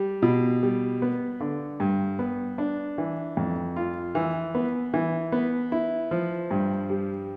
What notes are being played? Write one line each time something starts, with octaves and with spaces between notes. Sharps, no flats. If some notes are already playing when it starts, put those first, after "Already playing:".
Already playing: G3
B2
G3
B3
D3
G2
B3
D4
E3
F2
F4
E3
B3
E3
B3
E4
F3
G2
G3